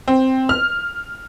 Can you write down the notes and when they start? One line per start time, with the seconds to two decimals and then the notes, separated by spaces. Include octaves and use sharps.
0.08 C4
0.49 F6